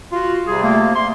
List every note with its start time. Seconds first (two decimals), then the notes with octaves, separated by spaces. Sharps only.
0.12 F4 F#4
0.47 C3 G3 G#4
0.63 A3 A#3
0.83 C3
0.95 C6